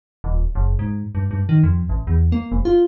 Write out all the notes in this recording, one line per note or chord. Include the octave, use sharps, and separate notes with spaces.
D#1
F#1
G#2
G2
G2
D#3
F2
A1
E2
A#3
F1
F4